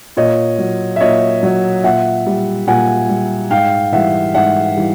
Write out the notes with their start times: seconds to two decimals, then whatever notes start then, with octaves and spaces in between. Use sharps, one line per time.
0.17 A#2 C#5 D#5
0.58 F#3
0.96 E5
1.00 A#2 C#5 D#5
1.43 F#3
1.84 A#2 E5 F#5
2.26 G3
2.67 A#2 F#5 G#5
3.09 G3
3.50 G#2 F5 G5
3.92 E3 G3 E5 F#5
4.34 G#2 E5 F#5
4.77 E3 G3